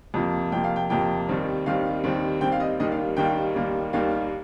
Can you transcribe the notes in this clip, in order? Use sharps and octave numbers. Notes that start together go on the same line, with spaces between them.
F2 C3 F3 A#3
F2 C3 F3 A#3 G5
F5
G5
F2 C3 F3 A#3 G5
D#2 D#3 G3 C4
D#2 D#3 G3 C4 F5
D#2 D#3 G3 C4
D#2 D#3 G3 C4 G5
F5
D#5
D#2 D#3 G3 A#3 D#5
F5
D#2 D#3 G3 A#3 G5
D#2 D#3 G3 A#3
D#2 D#3 G3 A#3 F5